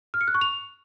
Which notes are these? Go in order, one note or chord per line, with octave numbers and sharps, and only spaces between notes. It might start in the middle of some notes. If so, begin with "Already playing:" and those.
F6
C#7
F#6
C#6
F7